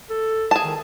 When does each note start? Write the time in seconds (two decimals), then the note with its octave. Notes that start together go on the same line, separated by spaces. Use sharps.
0.10 A4
0.51 G#4 A5
0.64 D#3